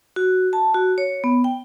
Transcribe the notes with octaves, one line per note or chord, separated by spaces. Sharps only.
F#4
A5
F#4
C#5
B3
G5